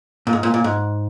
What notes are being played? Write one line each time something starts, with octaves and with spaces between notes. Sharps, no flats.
A#2
G#2
A#2
A#2
G#2